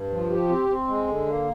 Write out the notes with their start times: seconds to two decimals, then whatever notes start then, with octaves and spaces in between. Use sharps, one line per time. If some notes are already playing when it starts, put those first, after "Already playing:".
Already playing: G2
0.10 F3
0.30 G4
0.49 C4
0.69 C4
0.88 G#3
1.08 D3
1.27 A#3